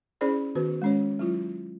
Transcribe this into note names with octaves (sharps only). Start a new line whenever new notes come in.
C#4 E4 G#4 C5 D5 B5
D#3 B3 F#4 B4
G#3 C#4 C#5
F#3 E4 F4